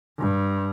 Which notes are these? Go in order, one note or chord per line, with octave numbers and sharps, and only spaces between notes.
G2